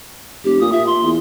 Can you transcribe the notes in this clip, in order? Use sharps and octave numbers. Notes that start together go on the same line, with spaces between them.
F1 G4
A#2 D#6
A#2 E5
C6
E2